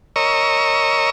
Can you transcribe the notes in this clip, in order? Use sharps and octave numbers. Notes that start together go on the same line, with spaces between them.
A#4 C#5 D#5 A#5 C#6 E6